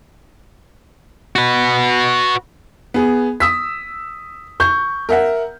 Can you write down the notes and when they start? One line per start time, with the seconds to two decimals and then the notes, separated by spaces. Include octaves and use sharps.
1.36 F#4 B4
2.94 B3 G#4
3.40 D#6 E6 B6
4.60 C#6 G6
5.09 A#4 E5 F#5